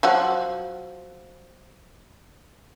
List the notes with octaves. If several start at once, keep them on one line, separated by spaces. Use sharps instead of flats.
F3 F#3 F#5